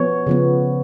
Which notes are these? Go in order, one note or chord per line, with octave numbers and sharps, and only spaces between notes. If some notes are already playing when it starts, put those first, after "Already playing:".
Already playing: F3 B3 C#5
C#3 F3 B3